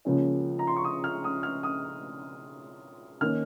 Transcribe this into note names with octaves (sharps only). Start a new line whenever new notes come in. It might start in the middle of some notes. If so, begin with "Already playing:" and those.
C#2 C#3 F3 A#3 C#4
A#5
C6
C#6
D#6
F6
D#6
F6
D#6
D#3 A#3 C#4 F6